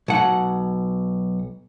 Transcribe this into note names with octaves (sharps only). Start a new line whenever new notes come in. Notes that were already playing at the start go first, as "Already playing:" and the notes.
B1 F#5